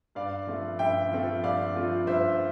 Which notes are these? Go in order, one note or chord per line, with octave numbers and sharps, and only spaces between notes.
G2 D5 F5
F3 A3 C4 F4
G2 E5 G5
F3 A3 C4 F4
G2 D5 F5
F3 A3 C4 F4
G2 C5 E5